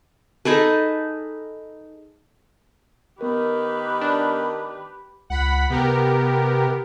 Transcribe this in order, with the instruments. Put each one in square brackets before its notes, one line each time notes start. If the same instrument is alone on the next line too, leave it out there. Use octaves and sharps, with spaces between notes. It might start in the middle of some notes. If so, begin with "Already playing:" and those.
[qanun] D#4 G#4 A4 B4
[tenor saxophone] D#3 [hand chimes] B3 A#4 [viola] G4 B4
[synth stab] D4
[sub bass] C#2 [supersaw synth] F#5 B5 B6
[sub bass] C3 [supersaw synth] B3 G4 A#4